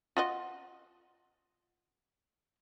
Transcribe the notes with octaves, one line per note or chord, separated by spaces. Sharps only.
F4 F#4 D#5